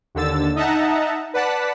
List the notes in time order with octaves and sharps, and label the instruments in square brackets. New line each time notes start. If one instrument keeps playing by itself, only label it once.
[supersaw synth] D#2 D3 E6 A6
D#4 D#5 E5 F#5 A5 A#5
B4 D5 F#5 A5 B6